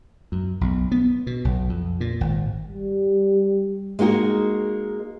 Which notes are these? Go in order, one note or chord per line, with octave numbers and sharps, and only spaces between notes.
F#2
B1
B3
B2
B1
F2
A#2
G#1
G3
G#3 A#3 D#4 F#4 G#4